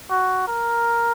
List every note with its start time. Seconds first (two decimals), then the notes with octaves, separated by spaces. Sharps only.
0.10 F#4
0.48 A#4